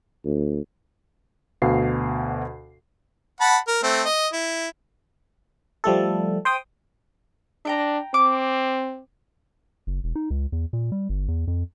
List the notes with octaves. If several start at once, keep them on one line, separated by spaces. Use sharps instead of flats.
D2
D2 B2 F5 C7
F#5 A5 B5
A#4
A3 C4
D#5
E4
F3 G3 A3 A4
C5 G5 D#6
D4 E5 G5 A#5
C4 D6
F#1
E1
D#4
C#2
E2
A#2
G3
G1
E2
F2